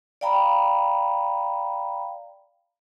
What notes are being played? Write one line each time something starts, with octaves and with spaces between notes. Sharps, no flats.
D5 F5 G5 A#5 B5